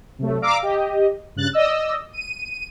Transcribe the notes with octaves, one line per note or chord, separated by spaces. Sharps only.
C3 F#3 A3
D5 F5 A#5 D6 E6
G4 D#5
G2 C#3 F#6 A6
D5 D#5 E6
D#7